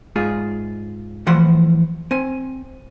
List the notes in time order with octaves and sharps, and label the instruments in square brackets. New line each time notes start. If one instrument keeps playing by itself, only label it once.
[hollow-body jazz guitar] G#2 F4 G#4
A2 E3 F3 F#5 C6
C4 G#5